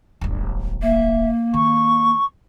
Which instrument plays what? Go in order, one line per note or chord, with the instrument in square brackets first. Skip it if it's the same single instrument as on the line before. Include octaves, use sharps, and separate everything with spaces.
[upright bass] D1 G1
[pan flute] A#3 [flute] E5
[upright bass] D#3 [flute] C#6